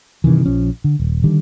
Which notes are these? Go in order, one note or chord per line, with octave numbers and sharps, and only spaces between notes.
G2 C3 D#3 E3
A#1 F3 C#4
D3
D#1
D3 D#3 G3